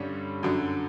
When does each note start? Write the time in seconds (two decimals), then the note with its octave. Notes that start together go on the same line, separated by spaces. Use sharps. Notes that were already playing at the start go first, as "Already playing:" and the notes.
Already playing: G2 D3 G3 C#4
0.43 F#2 D3 F#3